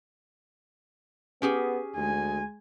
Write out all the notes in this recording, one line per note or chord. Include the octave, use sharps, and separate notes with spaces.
B3 C#4 G4 G#4
D2 G#3 G#5